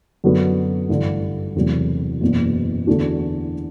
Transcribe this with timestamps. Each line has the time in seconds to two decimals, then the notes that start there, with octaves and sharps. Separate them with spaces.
0.24 F#2 D3 F#3 B3 F#4
0.89 A1 G2 D3 G3
1.56 E1 E2 C3 F#3 A3
2.21 F#1 E2 B2
2.87 E2 D3 A3 D4 F#4